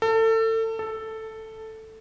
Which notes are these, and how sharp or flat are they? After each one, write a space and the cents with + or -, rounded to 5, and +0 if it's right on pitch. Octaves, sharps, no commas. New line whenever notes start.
A4 +30
A4 +5